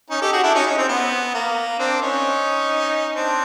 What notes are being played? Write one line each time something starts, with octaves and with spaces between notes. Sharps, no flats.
C#4 D#4
G4 A4
F#4 G#4
D4 E4
C#4 D#4
C#4
C4
B3
A#3
C4 D4
C#4 D#4
C4 D4